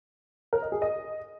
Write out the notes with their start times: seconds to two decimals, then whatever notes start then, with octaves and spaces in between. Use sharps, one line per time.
0.53 A#4
0.62 D#5
0.72 G#4
0.82 D#5